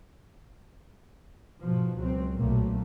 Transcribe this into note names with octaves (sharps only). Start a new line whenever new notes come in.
G#2 B2 F3
C#2 F#3 C4
B1 A#2 F3 F#3 A3 A#3